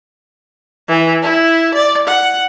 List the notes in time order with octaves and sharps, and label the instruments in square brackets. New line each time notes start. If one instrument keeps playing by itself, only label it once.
[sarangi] E3
E4
D5
F#5